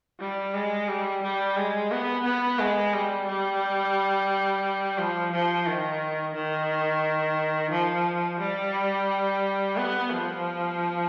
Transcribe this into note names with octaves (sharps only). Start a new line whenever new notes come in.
G3
G#3
G3
G3
G#3
B3
B3
G#3
G3
G3
F3
F3
D#3
D#3
F3
G3
B3
F3